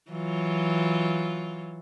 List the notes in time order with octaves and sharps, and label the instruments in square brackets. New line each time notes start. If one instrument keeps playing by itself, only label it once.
[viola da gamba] E3 F#3 F4